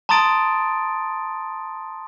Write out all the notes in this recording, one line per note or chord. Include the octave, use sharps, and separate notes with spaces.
A5 A#5 C6 D#6 A6 D7